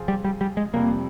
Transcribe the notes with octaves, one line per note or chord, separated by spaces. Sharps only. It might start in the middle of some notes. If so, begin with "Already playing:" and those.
Already playing: C3 F3 C4 F4 G#4
G3
G3
G3
G#3
F1 F2 C3 G3 A#3